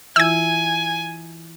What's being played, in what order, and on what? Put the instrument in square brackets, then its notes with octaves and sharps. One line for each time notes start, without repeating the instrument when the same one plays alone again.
[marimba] E3 E4 F4 [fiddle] G#5 [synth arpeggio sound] E6 G#6